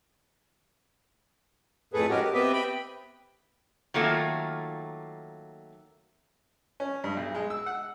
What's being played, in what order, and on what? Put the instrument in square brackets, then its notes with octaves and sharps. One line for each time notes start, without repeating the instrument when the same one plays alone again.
[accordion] F2 A2 A3 G#4 A4 B4
G#3 C#4 F#4 G4 A#4
G4
B3 C4 G4 B4 D#5 E5
G5 B5
[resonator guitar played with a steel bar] D#3 F#3 A3 A#3 F4
[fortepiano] C#4
G2
B1
G#3
E6
F#5